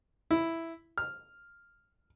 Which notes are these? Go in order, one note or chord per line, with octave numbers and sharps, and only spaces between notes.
E4
F6